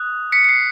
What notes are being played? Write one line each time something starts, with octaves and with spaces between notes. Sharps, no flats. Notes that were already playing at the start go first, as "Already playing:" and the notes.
Already playing: D#6 F#6
B6 C#7
C#7
C7